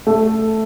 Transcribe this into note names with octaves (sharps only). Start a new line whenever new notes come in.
A3